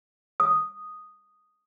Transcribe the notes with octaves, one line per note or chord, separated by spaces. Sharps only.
D#6